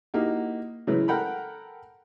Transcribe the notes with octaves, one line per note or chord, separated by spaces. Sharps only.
A#3 D#4 E4 F#4 G4
C#3 E3 F#3 G#3 E4 B4
A4 A#4 F#5 G5 A#5 B5